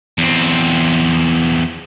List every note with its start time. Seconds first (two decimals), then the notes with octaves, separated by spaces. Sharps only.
0.18 E2 C4